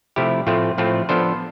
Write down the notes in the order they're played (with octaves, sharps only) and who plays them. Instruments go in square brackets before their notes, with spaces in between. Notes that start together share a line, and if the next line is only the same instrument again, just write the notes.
[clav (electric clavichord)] C3 F3 A3 E4 G4
A2 F3 A3 C4 F4
A2 F3 A3 C4 F4
F3 B3 D4 A4 C5